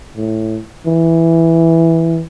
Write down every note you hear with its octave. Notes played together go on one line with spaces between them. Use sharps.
A2
E3